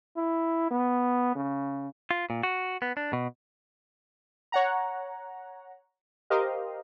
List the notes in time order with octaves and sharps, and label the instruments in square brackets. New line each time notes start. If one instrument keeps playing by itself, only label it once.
[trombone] E4
B3
C#3
[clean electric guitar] F4
A#2
F#4
B3
D4
B2
[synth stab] C#5 F#5 A#5
G4 A#4 C5 D#5 F5